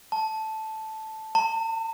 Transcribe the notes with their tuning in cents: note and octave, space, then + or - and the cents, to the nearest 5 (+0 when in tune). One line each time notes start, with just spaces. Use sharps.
A5 -5
A5 +45